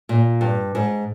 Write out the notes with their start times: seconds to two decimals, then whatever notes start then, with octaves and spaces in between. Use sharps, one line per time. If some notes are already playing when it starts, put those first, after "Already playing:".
0.09 A#2
0.41 G2
0.75 G#2